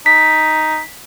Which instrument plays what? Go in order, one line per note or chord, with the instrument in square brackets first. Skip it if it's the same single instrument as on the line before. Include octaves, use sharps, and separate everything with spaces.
[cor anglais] D#4 [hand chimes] B6